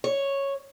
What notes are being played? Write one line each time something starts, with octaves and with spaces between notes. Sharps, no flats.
C#5